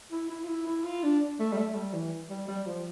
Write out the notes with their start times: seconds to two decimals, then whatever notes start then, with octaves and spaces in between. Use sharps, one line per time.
0.11 E4
0.29 E4
0.44 F4
0.48 E4
0.66 E4
0.84 F4
1.03 D4
1.39 A3
1.52 G3
1.57 A3
1.75 G3
1.93 E3
2.30 G3
2.48 G3
2.67 F3